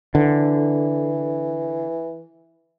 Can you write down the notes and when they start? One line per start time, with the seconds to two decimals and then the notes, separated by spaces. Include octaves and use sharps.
0.15 D3 E3